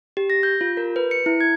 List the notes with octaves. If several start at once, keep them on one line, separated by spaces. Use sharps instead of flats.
G4
A#6
G6
F4
A#4
B4
C#7
E4
G#6